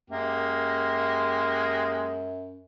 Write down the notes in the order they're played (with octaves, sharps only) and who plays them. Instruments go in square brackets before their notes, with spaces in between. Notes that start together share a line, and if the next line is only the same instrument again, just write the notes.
[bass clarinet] F#2 [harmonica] G#3 A#3 G4